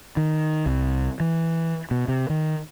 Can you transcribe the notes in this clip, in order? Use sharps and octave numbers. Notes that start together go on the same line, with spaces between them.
D#3
C2
E3
B2
C3
D#3